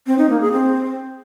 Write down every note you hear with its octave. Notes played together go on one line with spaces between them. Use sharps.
C4
D#4
A#3
G#4
C4